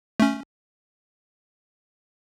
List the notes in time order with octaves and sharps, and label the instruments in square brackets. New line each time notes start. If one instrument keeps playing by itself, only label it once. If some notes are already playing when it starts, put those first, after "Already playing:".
[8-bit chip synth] A3 C#4